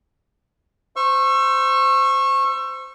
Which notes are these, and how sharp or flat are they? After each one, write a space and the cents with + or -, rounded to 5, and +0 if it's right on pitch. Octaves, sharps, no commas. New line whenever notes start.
C5 -15 C#6 -20 E6 +25